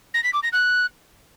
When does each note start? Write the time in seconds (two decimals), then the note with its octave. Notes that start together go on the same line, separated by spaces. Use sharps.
0.14 A#6
0.23 B6
0.33 D6
0.43 A#6
0.52 F#6